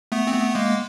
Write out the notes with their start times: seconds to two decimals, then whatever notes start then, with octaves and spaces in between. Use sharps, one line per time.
0.12 A3 B3
0.27 C4
0.34 A3 B3
0.55 G#3 A#3